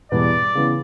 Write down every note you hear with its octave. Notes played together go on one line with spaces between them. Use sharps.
E2 B2 G3 B3 E4 D5
C#3 E3 B3